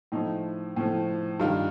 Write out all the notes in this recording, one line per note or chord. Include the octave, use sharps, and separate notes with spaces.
A2 F3 D#4
A2 F3
G2 D#3 F4